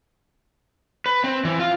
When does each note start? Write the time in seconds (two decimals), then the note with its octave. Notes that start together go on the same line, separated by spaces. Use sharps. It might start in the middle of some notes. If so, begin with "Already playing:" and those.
1.06 B4
1.24 C4
1.45 E3
1.59 F4